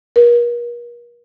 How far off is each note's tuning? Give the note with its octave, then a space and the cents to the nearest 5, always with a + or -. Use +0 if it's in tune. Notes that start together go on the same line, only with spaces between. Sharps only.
A#4 +40